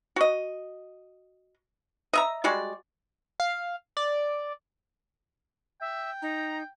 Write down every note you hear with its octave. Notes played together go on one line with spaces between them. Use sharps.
F#4 D#5
D#5 E5 A#5
G3 G#3 F#4 D5
F5
D5
E5 G5
D#4 A#5